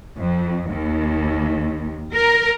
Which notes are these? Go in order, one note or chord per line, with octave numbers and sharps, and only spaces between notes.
F2
D#2
A#4